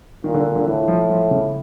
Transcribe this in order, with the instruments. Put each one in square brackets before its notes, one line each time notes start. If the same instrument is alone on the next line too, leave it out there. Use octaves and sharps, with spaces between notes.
[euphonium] A#2 [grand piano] D#3
[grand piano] D3
D3
[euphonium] A2 [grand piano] E3
[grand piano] F3
F3
C#3